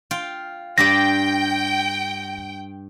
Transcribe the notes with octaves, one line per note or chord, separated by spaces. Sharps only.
F4 G5
G2 G4 D5 G5 A#6